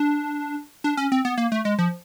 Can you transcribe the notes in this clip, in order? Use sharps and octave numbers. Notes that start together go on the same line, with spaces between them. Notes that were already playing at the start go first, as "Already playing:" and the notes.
Already playing: D4
D4
C#4
C4
B3
A#3
A3
G#3
F3